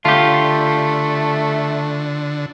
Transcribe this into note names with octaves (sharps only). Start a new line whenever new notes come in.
D3 A3 F4 G4